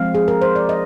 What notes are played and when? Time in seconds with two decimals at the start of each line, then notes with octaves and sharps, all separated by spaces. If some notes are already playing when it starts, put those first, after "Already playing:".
Already playing: F3 G#3 C4 F5
0.15 G#4
0.28 A#4
0.42 C5
0.56 D5
0.69 D#5